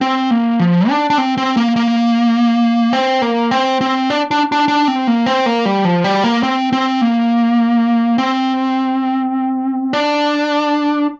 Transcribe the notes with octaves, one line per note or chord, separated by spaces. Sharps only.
C4
A#3
F3
D4
D4
C4
C4
A#3
A#3
C4
A#3
C4
C4
D4
D4
D4
D4
C4
A#3
C4
A#3
G3
F3
G3
A#3
C4
C4
A#3
C4
D4